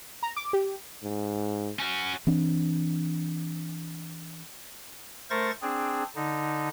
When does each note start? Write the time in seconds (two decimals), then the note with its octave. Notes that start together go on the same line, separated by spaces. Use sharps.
0.23 A#5
0.36 D6
0.53 G4
1.03 G#2
1.79 C#4 F#4
2.27 E3 C4 D4
5.30 A3 A#4 C5 C#6 A6 A#6
5.62 C4 D4 G#4
6.16 D3 D#4